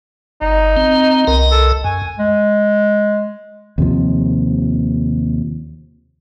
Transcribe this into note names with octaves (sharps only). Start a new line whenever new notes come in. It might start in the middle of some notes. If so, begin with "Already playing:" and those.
G1 D#4
C4
C2 A#4 D#5
A4
F#2 G#5
G#3
D#2 C3 F3